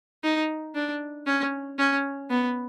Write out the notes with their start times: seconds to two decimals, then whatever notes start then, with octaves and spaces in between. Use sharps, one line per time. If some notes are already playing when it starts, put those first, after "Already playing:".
0.24 D#4
0.75 D4
1.27 C#4
1.78 C#4
2.30 B3